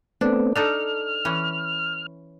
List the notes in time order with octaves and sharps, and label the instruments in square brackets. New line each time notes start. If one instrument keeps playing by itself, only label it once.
[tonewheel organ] A3 B3 C4 [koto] D4
[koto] D4 D#4 A4 [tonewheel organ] F6
[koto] E3 C#4